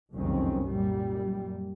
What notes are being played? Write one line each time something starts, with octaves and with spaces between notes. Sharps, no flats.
F#1 C2 F2 D#3 C4 C#4
F#2 A#2 G3